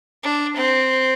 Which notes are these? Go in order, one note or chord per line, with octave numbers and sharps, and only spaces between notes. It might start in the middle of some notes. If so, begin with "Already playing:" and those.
D4
C4